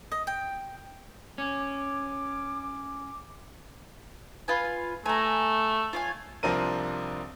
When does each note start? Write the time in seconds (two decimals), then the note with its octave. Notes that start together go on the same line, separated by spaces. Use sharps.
0.12 D#5
0.27 G5
1.38 C#4 D6
4.48 F4 B4 G#5
5.06 A3 G#5 A#5
5.93 F4 C#5 G#5
6.43 C2 F3 C4 D4 A#4 D#7